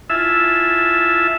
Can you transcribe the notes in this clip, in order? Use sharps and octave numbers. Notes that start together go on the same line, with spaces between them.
E4 F4 E5 G#5 A5 E6